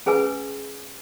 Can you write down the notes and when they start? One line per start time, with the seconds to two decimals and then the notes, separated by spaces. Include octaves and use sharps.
0.06 C#4 G#4 B4 G#5 E6